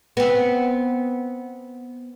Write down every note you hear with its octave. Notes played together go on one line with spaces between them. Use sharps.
B3 C4